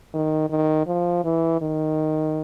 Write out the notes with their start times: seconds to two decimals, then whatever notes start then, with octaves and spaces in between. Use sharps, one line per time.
0.14 D#3
0.50 D#3
0.87 F3
1.24 E3
1.61 D#3